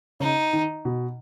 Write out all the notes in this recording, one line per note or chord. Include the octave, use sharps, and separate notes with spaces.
C#3 D#4
D#3
B2